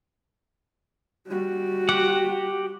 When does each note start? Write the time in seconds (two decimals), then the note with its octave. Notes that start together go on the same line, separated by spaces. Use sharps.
1.27 G3 F#4
1.89 G4 F#5